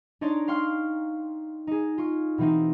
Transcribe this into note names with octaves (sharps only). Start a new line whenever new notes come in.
D4 D#4 C#5 D5 A#5 C6
F5 G5 C6 C#6 F6
D#4 G#4
F4 C#6
B2 E3 C4 D#4